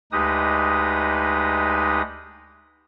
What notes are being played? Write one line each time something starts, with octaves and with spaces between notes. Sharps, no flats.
D2 G#3 D#4 G4 B4 D#6